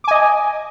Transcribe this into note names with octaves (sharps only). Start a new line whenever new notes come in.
D#5 G#5 D6